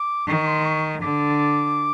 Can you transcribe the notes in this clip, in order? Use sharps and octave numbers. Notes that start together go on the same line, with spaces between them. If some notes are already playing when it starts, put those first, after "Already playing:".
Already playing: D6
D#3 C#6
C6
C#6
D3 D6